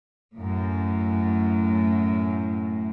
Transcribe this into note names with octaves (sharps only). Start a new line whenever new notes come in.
F#2 A2